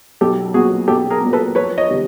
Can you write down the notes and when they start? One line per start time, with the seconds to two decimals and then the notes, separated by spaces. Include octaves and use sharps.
0.21 B1 G4 A4
0.54 A#2 F#3 B3 F#4 G#4
0.88 B1 G4 A4
1.10 G#4 A#4
1.21 A#2 F#3 B3
1.33 A4 B4
1.55 F2 B4 C#5
1.78 C#5 D#5
1.89 C3 D#3 G3 B3